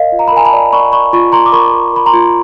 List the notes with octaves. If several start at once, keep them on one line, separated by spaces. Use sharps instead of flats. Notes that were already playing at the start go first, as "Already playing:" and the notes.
Already playing: A#4 D#5 F5
F4
A#5
B5
A#4 G#5 A#5
A5 B5
D5
D5 B5 C#6
D5 B5 C#6
F4 B5 C#6
F4 A#5 C6
D6
A#4 B5 C#6
A#4
A#4 B5
A#5 C6
F4